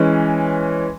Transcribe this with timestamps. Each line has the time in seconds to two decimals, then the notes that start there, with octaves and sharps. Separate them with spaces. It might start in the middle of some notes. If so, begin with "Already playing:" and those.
Already playing: E3 G#3 C#4